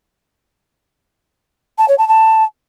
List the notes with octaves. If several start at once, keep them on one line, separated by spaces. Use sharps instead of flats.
A5
C#5
A5
A5